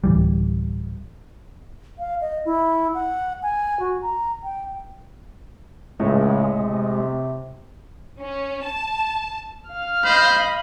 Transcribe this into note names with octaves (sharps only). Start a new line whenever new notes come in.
D1 A#1 E3 G3
F5
D#5
E4
F#5
G#5
F#4
A#5
G5
C#2 A2 G#3
C3
C#4
A5
F5 F6
C5 D#5 B5